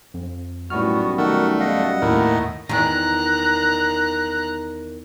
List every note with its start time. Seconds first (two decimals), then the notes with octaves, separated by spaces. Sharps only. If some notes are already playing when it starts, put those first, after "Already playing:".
0.14 F2
0.70 B1 F#2 A2 G3 A3 B3 F#4 F6
1.18 D#3 A3 F#4 A#4 F#5
1.60 D#5 F5 F#5
2.02 D#2 A2 E4 A#4
2.69 E2 D#3 A#5 F#6